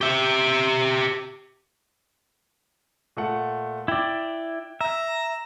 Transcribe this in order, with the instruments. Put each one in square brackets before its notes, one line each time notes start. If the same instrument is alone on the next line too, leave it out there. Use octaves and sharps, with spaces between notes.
[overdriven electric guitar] G4 E5
[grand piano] A#2 A3 F#5
[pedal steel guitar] E4 D5 [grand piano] G5
[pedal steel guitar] E5 [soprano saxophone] A#5